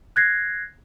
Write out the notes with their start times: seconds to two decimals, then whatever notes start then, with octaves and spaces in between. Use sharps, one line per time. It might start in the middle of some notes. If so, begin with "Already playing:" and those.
0.16 F#6 G#6 A#6 C7